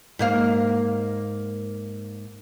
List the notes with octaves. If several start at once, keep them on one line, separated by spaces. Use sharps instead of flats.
G#2 A#3 F5